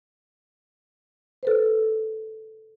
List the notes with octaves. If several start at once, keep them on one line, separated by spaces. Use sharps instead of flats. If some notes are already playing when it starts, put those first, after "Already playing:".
A4 B4 C5